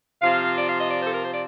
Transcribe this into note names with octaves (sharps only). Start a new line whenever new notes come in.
C3 F3 C4 F4 F5
D5
F5
D#5
D5
C5
A4
A#4
C5
D5